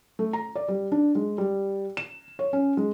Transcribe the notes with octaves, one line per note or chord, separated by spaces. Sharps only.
A3
A#5
D5
G3
D4
G#3
G3
E7
C#5
C#4
G#3